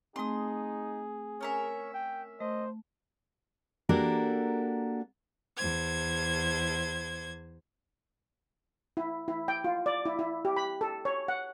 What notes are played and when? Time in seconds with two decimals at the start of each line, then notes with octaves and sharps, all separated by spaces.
0.16 A3 C4 D#4 G#4 C6 D#6
1.41 C#4 A#4 C#5 E5
1.94 G5
2.40 A3 C5 D#5
3.89 A#3 D4 F#4 G4 A4 A#4
5.57 E2 C5 G#6
8.97 E4
9.28 E4
9.48 G5
9.64 F4
9.86 D5
10.05 E4
10.19 E4
10.45 G4
10.56 B5
10.81 A4
11.05 C#5
11.28 F#5